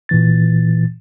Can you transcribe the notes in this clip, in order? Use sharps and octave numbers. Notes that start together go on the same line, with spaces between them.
A#2 E3 A6